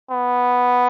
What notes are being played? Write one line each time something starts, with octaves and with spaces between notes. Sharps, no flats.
B3